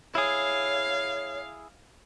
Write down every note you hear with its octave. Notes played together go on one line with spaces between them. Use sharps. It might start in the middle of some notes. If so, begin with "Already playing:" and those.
E4 G#4 C#5 F5